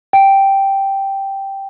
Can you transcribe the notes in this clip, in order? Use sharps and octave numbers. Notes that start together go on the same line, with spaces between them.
G5